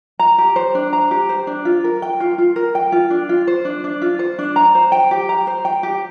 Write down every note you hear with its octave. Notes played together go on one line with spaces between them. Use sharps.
A#5
G4
C5
D4
A#5
G4
C5
D4
F4
A#4
G5
F4
F4
A#4
G5
F4
D4
F4
C5
D4
D4
F4
C5
D4
A#5
C5
G5
G4
A#5
C5
G5
G4